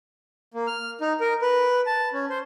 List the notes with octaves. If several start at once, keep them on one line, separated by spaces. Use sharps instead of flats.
A#3
F6
D#4
A#4
B4
A5
C#4
C5